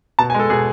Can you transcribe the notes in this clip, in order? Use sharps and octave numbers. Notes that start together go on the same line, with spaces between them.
B2 A5
G#5
G#3 A4
B2 G#4